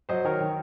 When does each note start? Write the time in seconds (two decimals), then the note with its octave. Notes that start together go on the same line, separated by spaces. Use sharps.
0.09 F#3 C5 D#5
0.24 D#3 A#4 C#5
0.40 D#3